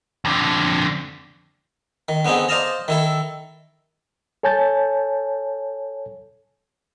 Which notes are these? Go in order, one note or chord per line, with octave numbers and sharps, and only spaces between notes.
F2 D3
D#3
D3 B3 C4 D#4 G#4
C5 D5 D#5 F5 A5 A#5
D#3 E4 A4
A4 C#5 G#5 A5 G6 A6